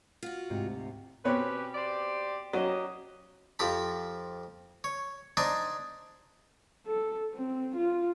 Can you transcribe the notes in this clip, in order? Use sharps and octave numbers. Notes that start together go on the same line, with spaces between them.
F4 F#4
D2 G#2 C3
B2 C4 C#4 G4 B4 C#5
G4 C5 D5
F#3 A#3 C#4 F#4 G4 D#5
F2 F3 G4 A5 B5
C#5
D4 D#4 C5 D5 G#5
A4
C4
F4